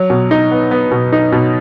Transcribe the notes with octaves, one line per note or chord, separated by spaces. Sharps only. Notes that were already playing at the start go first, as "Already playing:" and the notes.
Already playing: F#3
B2
D#4
B3
B3
B2
D#4
B2